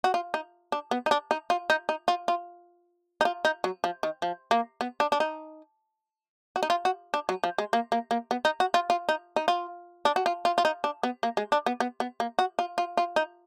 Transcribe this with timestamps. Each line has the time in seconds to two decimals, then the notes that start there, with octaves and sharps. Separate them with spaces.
0.04 F#4
0.14 F4
0.34 D#4
0.72 D4
0.91 B3
1.06 D#4
1.11 D4
1.31 D#4
1.50 F4
1.70 D#4
1.89 D#4
2.08 F4
2.28 F4
3.21 D#4
3.25 F4
3.45 D#4
3.64 F#3
3.84 F3
4.03 D#3
4.22 F3
4.51 A#3
4.81 B3
5.00 D4
5.12 D4
5.20 D#4
6.56 F#4
6.63 D#4
6.70 F4
6.85 F#4
7.14 D4
7.29 F#3
7.44 F3
7.58 G#3
7.73 A#3
7.92 A#3
8.11 A#3
8.31 B3
8.45 D#4
8.60 F#4
8.74 F4
8.90 F4
9.09 D#4
9.36 D#4
9.48 F4
10.05 D4
10.16 F#4
10.26 F4
10.45 F4
10.58 F4
10.65 D#4
10.84 D4
11.03 B3
11.23 A#3
11.37 G#3
11.52 D4
11.66 B3
11.80 B3
12.00 B3
12.20 A#3
12.39 F#4
12.59 F4
12.78 F4
12.97 F4
13.16 D#4